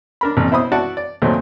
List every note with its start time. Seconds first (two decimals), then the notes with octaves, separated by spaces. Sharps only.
0.21 D4 A#4 B5
0.37 A1 F2 A#2
0.51 B2 E4 C5 B5 D#6
0.72 E4 F#4 D5 F#5 A5
0.97 D5
1.22 D#2 A#2 F#3 A3 C4